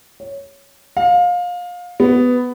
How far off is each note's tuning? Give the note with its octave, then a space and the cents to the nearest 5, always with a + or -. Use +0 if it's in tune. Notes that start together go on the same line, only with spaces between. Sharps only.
C#5 +5
F5 +25
B3 +10